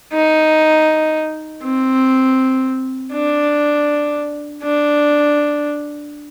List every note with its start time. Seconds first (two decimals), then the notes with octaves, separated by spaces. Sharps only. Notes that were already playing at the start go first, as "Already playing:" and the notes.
0.13 D#4
1.63 C4
3.13 D4
4.63 D4